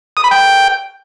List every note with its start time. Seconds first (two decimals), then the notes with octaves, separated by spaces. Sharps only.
0.17 D#6
0.24 B5
0.31 G5